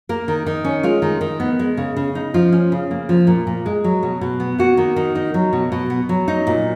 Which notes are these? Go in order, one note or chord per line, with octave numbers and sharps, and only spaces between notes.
A#3 A#4
D#3
D#3
C#4
G#3 F4
D#3
D#3
B3
G#3
C#3
C#3
D#4
F3 F4
C#4
C#3
A#3
F3
A#2
A#2
G#3
F#3
B2
B2
B3
A#3 F#4
D#3
D#3
D#4
F#3
B2
B2
B3
F#3
D#4
A#2